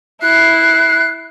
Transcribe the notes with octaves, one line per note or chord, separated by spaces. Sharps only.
E4 F#6 C7